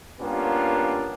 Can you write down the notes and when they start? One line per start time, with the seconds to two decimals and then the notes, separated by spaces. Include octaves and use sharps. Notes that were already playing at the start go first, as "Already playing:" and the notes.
0.20 G3 A#3 B3 C#4 D4 F4